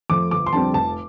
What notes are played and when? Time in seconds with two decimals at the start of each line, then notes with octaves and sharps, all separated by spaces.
0.10 F2 F3 A3 D6
0.31 G1 D6
0.46 C6
0.53 F2 D3 G3 C4 A5
0.74 F1 A5